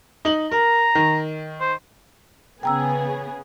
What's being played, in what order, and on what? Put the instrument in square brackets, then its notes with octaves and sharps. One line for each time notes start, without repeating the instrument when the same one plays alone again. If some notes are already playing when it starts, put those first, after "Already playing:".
[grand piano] D#4 F#7
[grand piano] A#4 [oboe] A#5
[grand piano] D#3
[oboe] C5
[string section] C#3 B3 G#4 [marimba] G5 A#5 E6